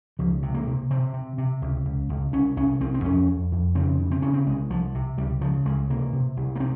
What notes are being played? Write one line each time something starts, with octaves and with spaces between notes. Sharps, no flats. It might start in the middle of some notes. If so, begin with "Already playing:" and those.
C#2 F3
C3
A#3
C3
C3 C4
C3
C3
C#2
C#2
C#2
C2 C#4
C2 C#4
C2 C4
C4
F2 C#4
F2
F2
C#3 C4
C#3
C4
C#3 C#4
C4
C2 G#3
C2 F3
C3
C#2 G3
C#3 F3
C#2 G#3
C3 A#3
C3
C2
A#3
C4